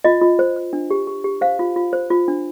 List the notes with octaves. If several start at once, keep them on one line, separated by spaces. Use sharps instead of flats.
F4 D#5
F4
C5
C5
D4
G4
G4
G4
C5 F5
F4
F4
C5
F4
D4